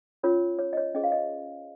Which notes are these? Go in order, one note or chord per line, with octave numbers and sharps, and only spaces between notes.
C#4 F4 A#4 C#5
C#5
D#5
C#5
C#4 G#4 C5 D#5
F5
D#5